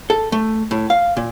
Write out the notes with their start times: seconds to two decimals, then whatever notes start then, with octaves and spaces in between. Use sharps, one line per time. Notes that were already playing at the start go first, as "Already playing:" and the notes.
0.10 A4
0.32 A3
0.71 A2
0.90 F5
1.17 A#2